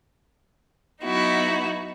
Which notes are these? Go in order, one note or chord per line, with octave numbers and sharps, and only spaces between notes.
F#3 B3 D#4 E4 F#4